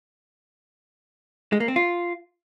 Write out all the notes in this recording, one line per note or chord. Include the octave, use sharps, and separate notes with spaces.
G#3
A#3
C4
F4